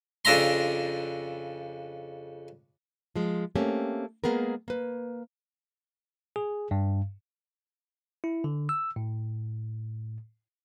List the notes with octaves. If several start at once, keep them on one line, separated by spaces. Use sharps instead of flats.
F2 C#3 D4 E5 A#5 C6
F3 G#3
A3 A#3 C4 C#4 G4
G#3 A#3 B3 G#4 A#4
A#3 B4
G#4
G2
E4
D3
E6
A2